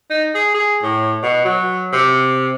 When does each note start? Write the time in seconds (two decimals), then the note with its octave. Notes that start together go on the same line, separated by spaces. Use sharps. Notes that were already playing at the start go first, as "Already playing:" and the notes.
0.10 D#4
0.35 G#4
0.54 G#4
0.82 A2
1.23 B2
1.45 F#3
1.92 C3